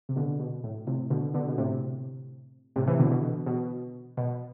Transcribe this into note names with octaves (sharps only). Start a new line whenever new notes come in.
C3
B2 D3
B2
A2
A2 C3
B2 D3
B2 D3
B2
A2 C3
A2 C3
C3 E3
B2 D3
B2
B2
B2
B2